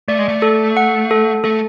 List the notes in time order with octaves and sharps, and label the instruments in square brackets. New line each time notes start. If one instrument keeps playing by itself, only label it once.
[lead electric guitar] A3 [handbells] D5
[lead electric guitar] G#3
A3
[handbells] A4
F#5
A4
[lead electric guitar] A3 [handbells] A4